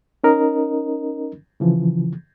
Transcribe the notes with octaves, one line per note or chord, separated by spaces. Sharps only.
C#4 D#4 A#4 D#5
C#3 E3 F3